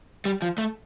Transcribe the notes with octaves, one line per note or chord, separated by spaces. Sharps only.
G3
F3
A3